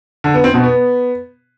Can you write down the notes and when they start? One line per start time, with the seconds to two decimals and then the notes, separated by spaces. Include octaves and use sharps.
0.24 D3
0.34 B3
0.44 C4
0.54 B2
0.64 B3